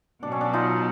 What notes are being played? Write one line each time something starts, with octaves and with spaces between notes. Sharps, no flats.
B2 F#3 B3 D4
C#4
D4
D#4 F4